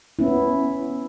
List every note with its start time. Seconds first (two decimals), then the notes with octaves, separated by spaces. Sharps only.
0.19 B3 C#4 E4